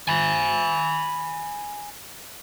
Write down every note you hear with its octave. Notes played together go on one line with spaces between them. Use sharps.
G#5 B5